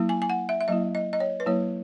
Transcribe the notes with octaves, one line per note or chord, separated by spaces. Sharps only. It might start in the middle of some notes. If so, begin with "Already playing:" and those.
Already playing: F#3 A#3 E4
G#5
G#5
F#5
E5
E5
F#3 A#3 E4 D#5
D#5
D#5
C#5
B4
F#3 A#3 E4 C#5